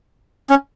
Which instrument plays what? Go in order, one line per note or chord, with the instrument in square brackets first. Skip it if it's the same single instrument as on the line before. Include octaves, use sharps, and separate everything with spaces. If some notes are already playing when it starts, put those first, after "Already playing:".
[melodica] C#4